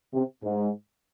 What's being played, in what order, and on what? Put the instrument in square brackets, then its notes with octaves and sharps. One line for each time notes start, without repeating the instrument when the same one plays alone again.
[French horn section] C3
G#2